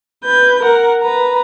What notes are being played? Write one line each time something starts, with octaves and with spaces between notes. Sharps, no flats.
B4 G6
A#4 F#5
B4 A#5